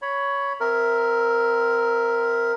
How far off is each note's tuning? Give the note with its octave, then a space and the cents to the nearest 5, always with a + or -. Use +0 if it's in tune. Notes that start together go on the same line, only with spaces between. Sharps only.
C#5 +10 B5 -5
C4 -20 A#4 +0 E5 +0